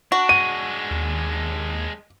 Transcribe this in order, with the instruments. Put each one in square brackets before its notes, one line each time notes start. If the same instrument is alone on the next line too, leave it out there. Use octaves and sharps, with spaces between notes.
[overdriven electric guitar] D4 [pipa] F#4
[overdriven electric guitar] G#3 D4 [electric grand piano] D#7
[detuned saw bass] D#2